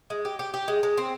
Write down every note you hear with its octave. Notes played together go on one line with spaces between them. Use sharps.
G#3
G4
G4
G4
G#3
G#3
C4